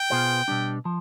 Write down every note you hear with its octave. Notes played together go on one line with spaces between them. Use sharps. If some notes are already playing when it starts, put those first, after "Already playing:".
Already playing: G5
B2 B3 F4 G#4 C5
B2 G3 D4
F3